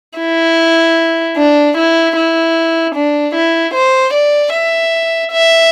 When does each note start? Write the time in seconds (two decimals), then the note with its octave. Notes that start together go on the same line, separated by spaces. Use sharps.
0.19 E4
1.37 D4
1.77 E4
2.16 E4
2.95 D4
3.35 E4
3.75 C5
4.14 D5
4.53 E5
5.32 E5